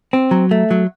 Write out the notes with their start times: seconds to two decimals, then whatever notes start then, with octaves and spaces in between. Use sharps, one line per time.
0.13 C4
0.31 F#3
0.51 A3
0.71 F#3